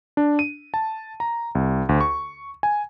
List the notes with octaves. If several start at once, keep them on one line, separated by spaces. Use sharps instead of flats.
D4
D#7
A5
A#5
C2
D2
C#6
G#5